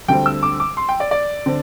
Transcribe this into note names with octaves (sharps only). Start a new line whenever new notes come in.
D2 D3 G3 C4 G5
E6
D6
D6
C6
G5
D5
D5
D3 C4